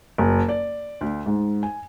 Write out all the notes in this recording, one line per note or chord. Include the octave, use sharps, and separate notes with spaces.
F#1
D5
D2
G#2
G#5